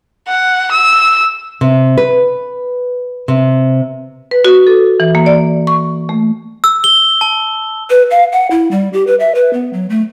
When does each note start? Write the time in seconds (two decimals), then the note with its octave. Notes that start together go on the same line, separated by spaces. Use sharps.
0.28 F#5
0.72 E6
1.61 C3
1.98 B4
3.28 C3
4.31 B4
4.45 F#4
4.67 A4
5.00 E3
5.15 A#3
5.26 D5
5.67 C#6
6.09 A3
6.64 E6
6.84 G7
7.21 A5
7.90 B4
8.11 F5
8.32 F#5
8.51 E4
8.71 G3
8.93 G4
9.07 B4
9.20 E5
9.35 B4
9.53 B3
9.73 F#3
9.90 A3